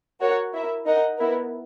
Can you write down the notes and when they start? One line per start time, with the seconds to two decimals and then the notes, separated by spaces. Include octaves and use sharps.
0.20 F#4 A#4 C#5 F#5
0.53 E4 A#4 E5
0.86 D#4 A#4 D#5 F#5
1.18 B3 E4 A#4